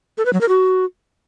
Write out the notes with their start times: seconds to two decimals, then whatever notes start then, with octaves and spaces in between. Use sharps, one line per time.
0.18 A4
0.25 B4
0.33 F#3
0.41 A#4
0.48 F#4